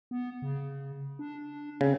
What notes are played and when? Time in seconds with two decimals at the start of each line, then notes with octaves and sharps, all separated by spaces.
0.11 B3
0.42 C#3
1.19 D4
1.81 C#3 C4